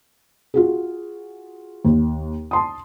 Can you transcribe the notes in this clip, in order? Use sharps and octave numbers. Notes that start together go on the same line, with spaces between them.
F4 F#4 G#4
D#2
A5 C6 D#6